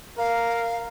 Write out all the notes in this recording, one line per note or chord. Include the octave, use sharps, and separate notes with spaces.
A#4 F5